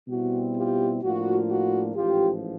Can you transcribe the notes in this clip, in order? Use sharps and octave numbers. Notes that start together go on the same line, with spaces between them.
B2 G3 C4 E4 F#4
F4 G4
A2 F3 A#3 D4 F4 F#4
F#4
A1 G#2 F3 F4 G4